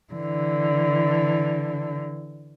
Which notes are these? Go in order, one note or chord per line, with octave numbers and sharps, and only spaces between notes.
D3 E3